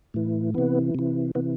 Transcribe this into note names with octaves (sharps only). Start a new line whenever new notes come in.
A2 E3
C3 E3 B3
C3 E3
C3 E3 B3